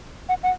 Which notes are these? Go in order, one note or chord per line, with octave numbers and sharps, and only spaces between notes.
F#5
F#5